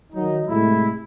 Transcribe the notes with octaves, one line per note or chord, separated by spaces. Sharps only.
D#3 F#3 D#4
A2 C3 G#3 A3 E4